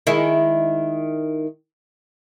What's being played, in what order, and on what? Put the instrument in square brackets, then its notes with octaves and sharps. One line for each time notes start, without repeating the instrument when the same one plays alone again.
[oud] D#3 G#3 E4